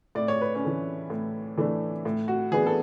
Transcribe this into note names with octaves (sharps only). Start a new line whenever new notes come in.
A2 D5
C#5
B4
C#4 C#5
E3 A3 D4
A2
E3 A3 D4
A2
F#4
E3 B3 D4 G#4
A4